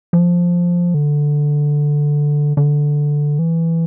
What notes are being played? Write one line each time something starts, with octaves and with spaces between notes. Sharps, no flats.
F3
D3
D3
E3